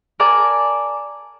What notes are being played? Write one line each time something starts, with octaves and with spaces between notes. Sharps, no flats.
A#4 D5 G#5 A5